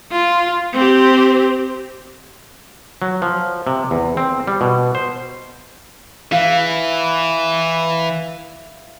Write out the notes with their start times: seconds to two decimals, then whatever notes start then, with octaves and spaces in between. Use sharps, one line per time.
0.12 F4
0.74 C4 G4
3.02 F#3
3.22 F3
3.67 C3
3.91 E2
4.17 C4
4.48 G3
4.61 B2
4.95 C5
6.32 E3 E5 F5